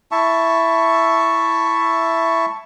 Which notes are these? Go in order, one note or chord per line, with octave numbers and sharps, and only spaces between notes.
E4 E5 A5 C#6